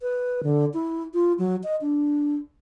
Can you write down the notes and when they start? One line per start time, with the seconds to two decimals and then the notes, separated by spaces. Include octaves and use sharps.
0.01 B4
0.43 D3
0.74 E4
1.14 F4
1.39 F#3
1.64 D#5
1.81 D4